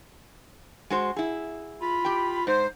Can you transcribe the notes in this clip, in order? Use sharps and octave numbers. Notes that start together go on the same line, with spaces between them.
G#3 F#4 C5
E4 G#4
F4 B5
G4 G5
G#2 C5